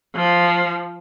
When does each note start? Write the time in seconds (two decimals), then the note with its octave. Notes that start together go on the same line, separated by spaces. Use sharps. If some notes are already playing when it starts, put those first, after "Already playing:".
0.15 F3